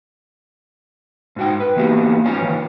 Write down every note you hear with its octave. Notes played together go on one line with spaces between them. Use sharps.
G#2 F#4 G5
B4
E3 A#3 B3 F#4 G4
G#2 C#4 F4 C#5 G#5
D#3 E3 B4